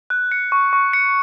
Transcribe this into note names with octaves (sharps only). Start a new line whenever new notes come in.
F#6
C#7
C#6
C#6
C#7